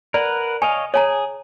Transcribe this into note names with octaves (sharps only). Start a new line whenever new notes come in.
A#4 B4 D5 F#5
C#5 D#5 F5 G#5
G#4 C#5 G#5 A#5